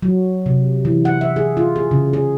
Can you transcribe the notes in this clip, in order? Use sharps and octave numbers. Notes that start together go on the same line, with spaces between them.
F#3
C3
E3
F#5
E5
G#4
F4
G#4
C#3
G#4